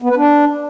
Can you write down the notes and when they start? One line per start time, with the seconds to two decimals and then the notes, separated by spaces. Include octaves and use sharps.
0.02 B3
0.09 B4
0.16 D4